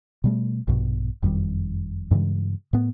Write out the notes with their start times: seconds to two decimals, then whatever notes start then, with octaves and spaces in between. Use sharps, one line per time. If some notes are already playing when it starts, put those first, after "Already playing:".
0.24 B2 G3 A3
0.67 A#1 G2 B2
1.23 F#1 F2 D#3 G3
2.11 G2 C#3 E3 G#3
2.73 A2 B3